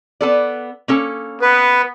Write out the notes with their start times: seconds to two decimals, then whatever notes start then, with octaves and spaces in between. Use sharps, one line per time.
0.21 B3 A4 D5
0.88 A#3 C#4 A4
1.42 B3 B4